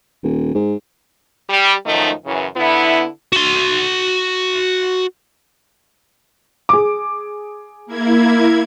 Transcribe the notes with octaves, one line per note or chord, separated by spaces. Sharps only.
D#1
G#2
G3
F#2 D#3 F3 A3 D#4
F#2 C#3 E3
D3 B3 E4
F#4 C6
G#4 D6
A#3 E4 G#6